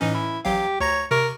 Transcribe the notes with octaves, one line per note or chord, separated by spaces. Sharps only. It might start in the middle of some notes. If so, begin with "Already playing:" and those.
A2 E3 C#4 D#4
E4
A1 F#3 G4 F5
D2 C#5 A#5 A#6
C3 A#4 C#6